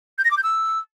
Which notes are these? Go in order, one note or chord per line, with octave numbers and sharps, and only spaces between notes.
G6
A#6
D6
G6
E6